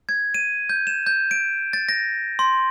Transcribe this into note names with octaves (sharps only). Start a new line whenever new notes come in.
G#6
D#7
G6
E7
G6
D7
A6
A#6
C6